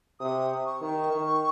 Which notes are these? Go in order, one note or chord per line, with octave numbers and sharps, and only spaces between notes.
C3 D#6
C#6
D#3
D#3